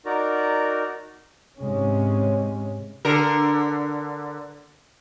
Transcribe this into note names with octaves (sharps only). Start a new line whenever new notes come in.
D#4 F#4 A#4 D5 A#5
G#2 C3 G#3 C#4
D3 A#4